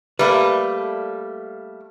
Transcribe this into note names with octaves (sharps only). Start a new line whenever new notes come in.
G3 A3 A#3 B4